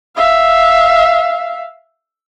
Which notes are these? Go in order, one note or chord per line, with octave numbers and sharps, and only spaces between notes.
E5 F5